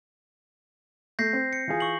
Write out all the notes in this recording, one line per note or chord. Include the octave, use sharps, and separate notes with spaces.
A3 G6 A#6 C7
C4
C#7
E3 F4 G#4
C#6 F#7